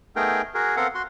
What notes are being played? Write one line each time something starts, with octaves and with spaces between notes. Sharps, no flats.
A3 B3 D#4 G#4 A#4 G5
F#4 G#4 A#4
B3 C4 A4 A#4 F5 F#5
F#4 C6